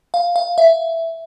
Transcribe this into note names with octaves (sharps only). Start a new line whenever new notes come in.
F5
F5
E5